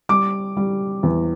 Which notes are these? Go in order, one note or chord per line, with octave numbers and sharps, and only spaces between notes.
G3 D6
G3
E2